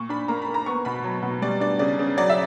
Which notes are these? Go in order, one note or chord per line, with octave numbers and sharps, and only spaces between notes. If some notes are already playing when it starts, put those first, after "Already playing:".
Already playing: A#2 C#6
D4 B5
A#3 A#5
B5
A#3
A#5
B3 C#6
B2 B5
F#3
B2
G3 D5
D4 D5
C#3 D5
C#3
F#3 D5
E5